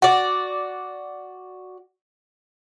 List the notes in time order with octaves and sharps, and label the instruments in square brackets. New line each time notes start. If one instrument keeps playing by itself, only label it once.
[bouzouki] F#4 D5 [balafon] F#5